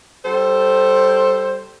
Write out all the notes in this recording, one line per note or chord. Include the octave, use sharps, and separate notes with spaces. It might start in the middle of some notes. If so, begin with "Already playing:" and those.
G3 A4 C5